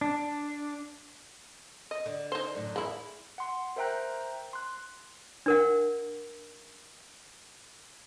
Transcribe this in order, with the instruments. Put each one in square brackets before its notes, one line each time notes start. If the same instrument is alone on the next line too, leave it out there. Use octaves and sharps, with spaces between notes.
[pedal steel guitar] D4
[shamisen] D#5
[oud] D3
[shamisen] D#4 C5
[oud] F#2 A2 D3
[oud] E2 [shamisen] G#3 A#3 E4
[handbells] F#5 C6
A#4 C5 E5 G5 A#5 F#6
C6 F#6
[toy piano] D4 A#4 F#5